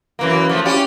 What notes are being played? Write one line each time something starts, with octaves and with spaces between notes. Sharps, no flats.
F#2 E3 A#3
F3 A3
C#4 E4 G4